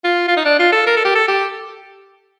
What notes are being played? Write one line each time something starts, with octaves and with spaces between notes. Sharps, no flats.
F4
F4
D#4
D4
F4
A4
A#4
A4
G4
A4
G4